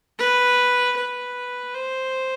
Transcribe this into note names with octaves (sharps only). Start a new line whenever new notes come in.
B4
B4
C5